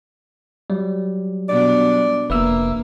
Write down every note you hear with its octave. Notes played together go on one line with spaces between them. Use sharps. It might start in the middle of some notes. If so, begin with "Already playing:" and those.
F#3 G3
B2 D4 D5
F1 A#3 B4 E5 E6